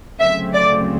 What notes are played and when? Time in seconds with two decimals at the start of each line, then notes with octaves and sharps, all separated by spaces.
0.19 D2 C#3 F#3 A3 C4 E5
0.53 D5